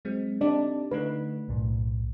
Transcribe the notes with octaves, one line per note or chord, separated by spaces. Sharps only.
F#3 G#3 C4
C4 D4 D#4 G4 D5
D3 A3 D#4 B4
B1 F#2 A2